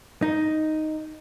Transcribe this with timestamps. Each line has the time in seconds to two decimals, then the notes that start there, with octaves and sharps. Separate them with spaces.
0.22 D#4